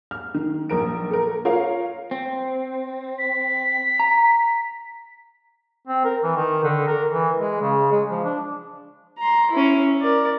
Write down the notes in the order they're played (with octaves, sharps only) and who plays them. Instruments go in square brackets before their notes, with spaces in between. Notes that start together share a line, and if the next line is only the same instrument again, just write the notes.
[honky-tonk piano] F6
D#3
A#1 A#4 D7
A4 A#4
F4 A#4 C#5 F5
[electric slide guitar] C4
[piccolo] B6
[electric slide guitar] A#5
[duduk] C4
A#4
E3
D#3
D3
A#4
E3
G#3
C#3
G#3
F3
D4
[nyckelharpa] A#5 C6
C#4 E4
A#4 D5